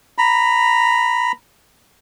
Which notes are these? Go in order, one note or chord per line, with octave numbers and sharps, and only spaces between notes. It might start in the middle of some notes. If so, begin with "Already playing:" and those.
A#5 B5